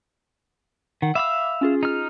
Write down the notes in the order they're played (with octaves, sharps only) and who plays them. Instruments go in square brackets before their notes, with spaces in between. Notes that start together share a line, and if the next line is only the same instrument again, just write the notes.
[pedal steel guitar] D#3 [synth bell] F#5
[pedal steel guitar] E5 F5 E6 [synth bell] B5 D6
[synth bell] C#4 F4 G#4
[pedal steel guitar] D#4 F6